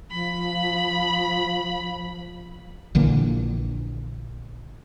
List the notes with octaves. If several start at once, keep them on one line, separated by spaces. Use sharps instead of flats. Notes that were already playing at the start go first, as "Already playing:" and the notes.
F3 B5
A#1 D3 E3 A#3